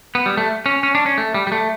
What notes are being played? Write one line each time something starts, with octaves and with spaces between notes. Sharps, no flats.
B3
G3
A3
C#4
C#4
D4
C#4
A3
G3
G3
A3